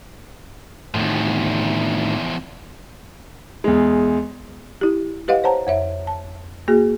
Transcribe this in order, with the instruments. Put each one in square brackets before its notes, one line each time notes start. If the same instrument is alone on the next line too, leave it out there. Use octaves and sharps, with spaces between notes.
[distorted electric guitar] E2 F3 [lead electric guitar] A2 D#3
[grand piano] E2 G#3
[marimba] E4 G4
G4 B4 D#5 F5 F#5
C5 C#5 F#5 A5 A#5
F2 C#5 E5
A5
A#3 F#4 G#4